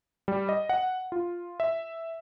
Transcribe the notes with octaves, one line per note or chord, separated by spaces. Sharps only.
G3
D#5
F#5
F4
E5